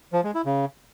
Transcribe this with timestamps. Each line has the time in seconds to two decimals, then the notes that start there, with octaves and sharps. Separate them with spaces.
0.13 F3
0.24 G#3
0.35 E4
0.46 C#3